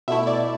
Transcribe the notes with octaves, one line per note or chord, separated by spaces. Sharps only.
B2 A3 E4 E5
D5